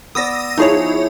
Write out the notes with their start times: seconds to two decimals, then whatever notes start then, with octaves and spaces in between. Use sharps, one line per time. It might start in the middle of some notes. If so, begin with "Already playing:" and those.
0.15 B3 D5 D#6 E6 A#6
0.58 F3 D#4 E4 G#4 C#5 C#6